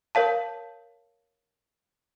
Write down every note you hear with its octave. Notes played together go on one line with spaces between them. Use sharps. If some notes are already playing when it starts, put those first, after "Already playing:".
A#4 C#5 F5 A5